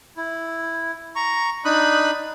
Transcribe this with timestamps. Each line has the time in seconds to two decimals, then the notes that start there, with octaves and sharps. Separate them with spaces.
0.17 E4
1.16 A#5 C#6
1.65 D4 D#4 B5 D#6 F#6